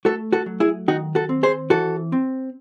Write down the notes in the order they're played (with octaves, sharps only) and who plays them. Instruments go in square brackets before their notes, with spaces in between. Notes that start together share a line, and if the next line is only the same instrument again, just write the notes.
[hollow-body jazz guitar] A3 F#4 A4
F#4 A4
F#3
E4 G#4
D#3 D#4 F#4
F#4 A4
C4
G#4 C5
E3 F#4 A4
C4